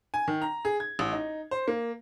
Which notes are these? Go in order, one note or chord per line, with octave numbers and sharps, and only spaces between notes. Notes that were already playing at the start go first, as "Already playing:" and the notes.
G#5
D#3
A#5
G#4
G#6
A1
D#4
C5
A#3